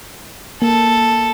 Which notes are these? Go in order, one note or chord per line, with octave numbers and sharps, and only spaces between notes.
A#3 A4